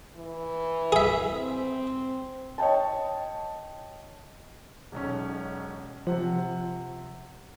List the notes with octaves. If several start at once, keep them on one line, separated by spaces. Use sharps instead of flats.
E3
G#4 E5
C4
C#5 D#5 G5 A5
E1 B1 C#4
C3 F3 F#5